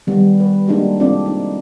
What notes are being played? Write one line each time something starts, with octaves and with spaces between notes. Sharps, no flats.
D#3 G3 B3
B4
G#3 A#3 D4 D#4 F#4 G4
C4 D4 F4 A4 D5
D#4